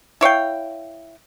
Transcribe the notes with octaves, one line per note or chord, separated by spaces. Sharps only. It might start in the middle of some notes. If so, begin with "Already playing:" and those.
E4 C#5 F5 G5